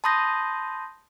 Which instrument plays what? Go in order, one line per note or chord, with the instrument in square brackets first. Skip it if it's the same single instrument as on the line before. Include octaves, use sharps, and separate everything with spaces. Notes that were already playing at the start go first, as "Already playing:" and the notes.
[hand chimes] A5 B5 C6 D#6 G6 A#6